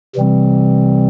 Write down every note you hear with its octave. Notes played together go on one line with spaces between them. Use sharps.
C3 E3 G3 C4